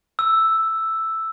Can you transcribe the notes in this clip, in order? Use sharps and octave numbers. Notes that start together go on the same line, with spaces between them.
E6